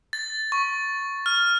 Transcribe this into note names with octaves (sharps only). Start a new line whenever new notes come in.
A6
C#6
F6